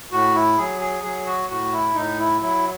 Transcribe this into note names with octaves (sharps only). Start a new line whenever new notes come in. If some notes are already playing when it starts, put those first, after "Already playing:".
A2 F#4
E4
F#3 G#4
G#4
F#3 G#4
F#4
A2 F#4
E4
A2 D#4
E4
F#3 E4